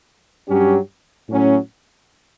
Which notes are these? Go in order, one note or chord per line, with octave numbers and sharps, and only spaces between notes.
G2 F#3 C#4 G4
A2 F#3 C#4